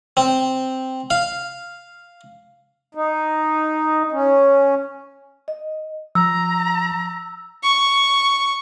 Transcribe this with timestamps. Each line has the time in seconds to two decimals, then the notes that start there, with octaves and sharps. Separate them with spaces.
0.17 C4
1.10 F5
2.95 D#4
4.12 C#4
5.48 D#5
6.15 F3 A#5 E6
7.63 C#6